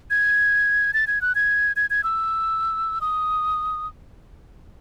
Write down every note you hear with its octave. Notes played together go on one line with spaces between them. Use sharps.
G#6
A6
G#6
F#6
G#6
G#6
G#6
E6
D#6